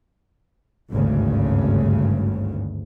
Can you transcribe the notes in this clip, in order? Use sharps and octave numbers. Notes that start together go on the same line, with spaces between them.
G#1 D2 G2 C#3